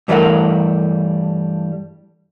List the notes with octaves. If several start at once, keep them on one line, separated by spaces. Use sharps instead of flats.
G2 E3 G3 A3 A#4 F#5